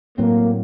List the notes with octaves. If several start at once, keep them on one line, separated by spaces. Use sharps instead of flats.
A2 F#3 A#3 C4